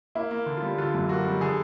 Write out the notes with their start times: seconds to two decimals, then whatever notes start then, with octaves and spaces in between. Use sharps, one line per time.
0.15 A#3 E4
0.31 A#3
0.46 D3
0.57 F4
0.62 G3
0.78 D3 F4
0.94 F#2
1.09 A#3 F#4
1.26 G3
1.41 D3 G#4